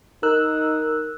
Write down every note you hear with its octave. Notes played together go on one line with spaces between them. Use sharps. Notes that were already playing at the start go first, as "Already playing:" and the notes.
D#4 A#4 E6 F#6